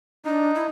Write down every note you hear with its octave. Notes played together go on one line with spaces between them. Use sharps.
D4 D#4
E4